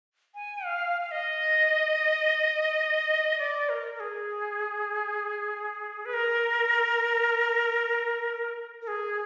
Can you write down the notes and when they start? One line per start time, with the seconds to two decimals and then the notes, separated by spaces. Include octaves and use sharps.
0.35 G#5
0.65 F5
1.02 F5
1.11 D#5
3.39 D5
3.69 A#4
3.95 A#4
4.00 G#4
6.05 B4
6.13 A#4
8.82 A#4
8.88 G#4